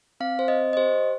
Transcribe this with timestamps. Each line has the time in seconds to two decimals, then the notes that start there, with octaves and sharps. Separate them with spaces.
0.20 C4 F5
0.39 C5
0.48 C4 D#5
0.73 D#5
0.77 G4 C5